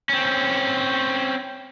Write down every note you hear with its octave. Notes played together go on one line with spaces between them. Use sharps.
C4 C#4